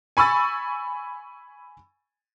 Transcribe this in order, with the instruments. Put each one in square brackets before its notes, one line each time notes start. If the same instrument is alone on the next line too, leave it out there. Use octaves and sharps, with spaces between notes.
[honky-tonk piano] G#5 B5 C#6 E6 A6